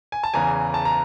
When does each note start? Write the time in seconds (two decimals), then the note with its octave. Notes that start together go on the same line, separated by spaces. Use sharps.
0.12 G#5
0.24 A5
0.34 E2 C#3 E3 G#5 A#5
0.74 A5
0.85 A#5